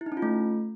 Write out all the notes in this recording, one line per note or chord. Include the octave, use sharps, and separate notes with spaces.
E4
D#4
C#4
F4
A3